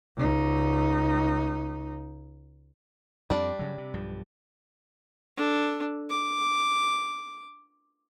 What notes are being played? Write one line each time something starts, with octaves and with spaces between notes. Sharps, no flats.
C#2 D#4
F2 G3 B3 C4 D4 D5
G2 C#3 F#3
C3
B1 G2 F3
D4 A4
D6